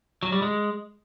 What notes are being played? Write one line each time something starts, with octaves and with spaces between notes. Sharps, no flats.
F#3
G3
G#3